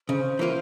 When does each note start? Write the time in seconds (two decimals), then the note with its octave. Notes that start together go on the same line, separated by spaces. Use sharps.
0.08 C#3 C5
0.39 E3 A#3 F4